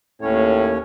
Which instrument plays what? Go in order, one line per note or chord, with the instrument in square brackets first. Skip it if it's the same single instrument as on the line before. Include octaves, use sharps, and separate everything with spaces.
[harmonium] D#2 C#4 C#5 [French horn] A2